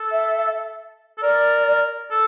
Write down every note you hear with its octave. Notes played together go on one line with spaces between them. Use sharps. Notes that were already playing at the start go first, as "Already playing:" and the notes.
Already playing: A4
E5
A4
A#4 D5
A4